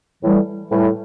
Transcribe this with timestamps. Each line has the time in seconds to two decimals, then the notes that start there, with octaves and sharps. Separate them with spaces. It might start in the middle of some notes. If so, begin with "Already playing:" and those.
0.22 A2 E3 G3
0.71 A2 E3 G3